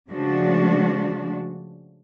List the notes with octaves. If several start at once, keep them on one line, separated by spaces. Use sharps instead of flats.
C#3 F3 G#3 A3 D4 F#4